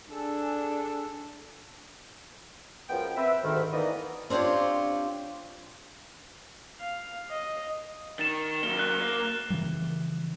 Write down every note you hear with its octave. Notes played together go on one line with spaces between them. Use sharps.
D4 G#4 A4
F#2 F3 G#3 B3 G5
C4 B4 E5
D2 G#2 D#3
E3 A#3 B3 D#4 D5 D#5
C4 D4 F4 G4 C#5
F5
D#5
D#3 A6 E7
F#3 A#3 G7
F#6
A#3
C#3 E3 F3 G3